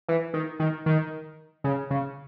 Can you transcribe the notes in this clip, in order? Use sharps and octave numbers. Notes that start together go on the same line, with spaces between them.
E3
D#3
D#3
D#3
C#3
C#3